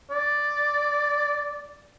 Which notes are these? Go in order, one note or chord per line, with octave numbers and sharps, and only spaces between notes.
D5